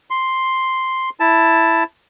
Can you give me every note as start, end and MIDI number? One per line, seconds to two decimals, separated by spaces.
0.10 1.09 84
1.20 1.83 64
1.20 1.83 81